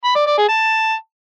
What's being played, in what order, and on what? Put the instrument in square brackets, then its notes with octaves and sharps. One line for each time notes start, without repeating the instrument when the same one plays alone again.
[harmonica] B5
D5
D5
G#4
A5